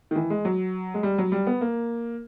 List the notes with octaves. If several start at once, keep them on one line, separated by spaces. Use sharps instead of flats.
D#3
E3
G#3
F#3
G#3
G3
F#3
G3
B3
A#3